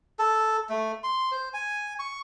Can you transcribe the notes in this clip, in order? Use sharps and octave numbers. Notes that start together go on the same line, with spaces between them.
A4
A3
C6
C5
G#5
C#6